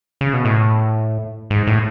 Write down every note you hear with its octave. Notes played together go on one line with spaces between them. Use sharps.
C#3
B2
A2
G#2
A2